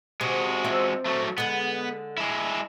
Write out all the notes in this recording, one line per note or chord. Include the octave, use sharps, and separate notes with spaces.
C3 G#3 F#4
F3 C4 E5
F#3 A3
D3 G#3 B3
G#3 E4